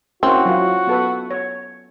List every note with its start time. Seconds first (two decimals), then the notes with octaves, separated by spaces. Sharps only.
0.23 A#3 C4 C#4 E4 F#4
0.45 F#3 E4 F4
0.87 B3 A4 B4
1.31 C#5